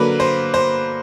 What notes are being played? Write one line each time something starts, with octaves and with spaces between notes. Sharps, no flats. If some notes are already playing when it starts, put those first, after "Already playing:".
Already playing: D3 F#3 A#3 B4
C5
C5